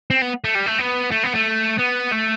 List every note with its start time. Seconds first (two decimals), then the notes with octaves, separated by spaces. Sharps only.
0.10 C4
0.22 B3
0.44 A3
0.55 G3
0.66 A3
0.79 B3
1.11 A3
1.23 B3
1.34 A3
1.79 B3
2.12 A3